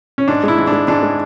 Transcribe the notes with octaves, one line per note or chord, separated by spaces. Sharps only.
C#4
G#2 D4
G#3 E4
G#2
D4
G#3
G#2 D4
G#3